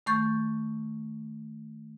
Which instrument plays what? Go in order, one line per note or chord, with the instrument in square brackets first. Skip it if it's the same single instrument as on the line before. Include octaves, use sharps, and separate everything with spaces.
[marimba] D#3 A3 C#6 G6 A6